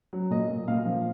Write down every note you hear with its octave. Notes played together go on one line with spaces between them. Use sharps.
F#3
A#2 D#5
A#2
A#2 F5
F3